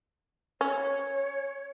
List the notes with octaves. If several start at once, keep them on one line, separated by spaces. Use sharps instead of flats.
C#4 C#5